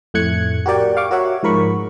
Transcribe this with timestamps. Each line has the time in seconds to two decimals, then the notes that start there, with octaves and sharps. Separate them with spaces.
0.14 F2 A2 A3 F#6 G#6 C#7
0.66 F#4 G4 A#4 D5 G5
0.97 F5 C#6 D6
1.11 F#4 A#4 C#5 E5 F#5
1.43 G#2 F3 A#4 B5 C#6